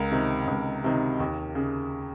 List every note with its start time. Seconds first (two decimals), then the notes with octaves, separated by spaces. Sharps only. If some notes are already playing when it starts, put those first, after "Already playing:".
Already playing: C#2 A#4
0.11 C3 D#3
0.47 C#2
0.84 C3 D#3
1.20 D#2
1.55 C#3